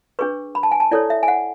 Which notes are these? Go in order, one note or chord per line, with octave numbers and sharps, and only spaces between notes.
D4 G#4 B4 C#6
B5
A5
G#5
A5
E4 A4 C#5 D5
E5
G#5
F#5